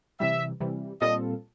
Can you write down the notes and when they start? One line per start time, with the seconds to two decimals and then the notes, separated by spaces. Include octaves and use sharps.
0.20 C3 E3 G3 E5
0.60 C3 E3 G3
1.01 A#2 G3 C4 F4 A4 D#5